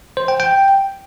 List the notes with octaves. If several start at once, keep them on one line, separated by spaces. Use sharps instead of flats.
C5
G5
G5